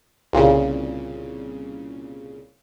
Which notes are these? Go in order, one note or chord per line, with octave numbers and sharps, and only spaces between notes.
C2 A#2 C#3